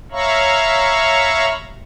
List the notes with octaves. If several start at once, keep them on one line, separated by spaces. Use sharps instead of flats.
C#5 E5 F5 A#5 B5 C#6